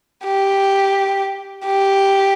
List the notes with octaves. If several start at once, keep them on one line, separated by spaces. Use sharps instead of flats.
G4
G4